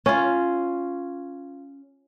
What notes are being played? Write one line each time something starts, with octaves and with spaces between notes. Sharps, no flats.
C#4 F4